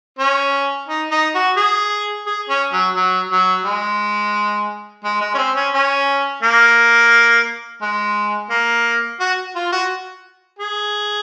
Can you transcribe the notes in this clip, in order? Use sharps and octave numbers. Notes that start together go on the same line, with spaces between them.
C#4
D#4
D#4
F#4
G#4
G#4
C#4
F#3
F#3
F#3
G#3
G#3
G#3
C#4
C4
C#4
C#4
A#3
G#3
A#3
F#4
F4
F#4
G#4